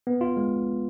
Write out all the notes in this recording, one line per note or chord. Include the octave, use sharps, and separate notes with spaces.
B3
F4
G#3